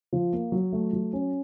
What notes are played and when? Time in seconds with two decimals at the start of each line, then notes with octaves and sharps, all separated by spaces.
0.13 F3
0.33 A#3
0.52 F#3
0.73 A3
0.93 F#3
1.13 C#4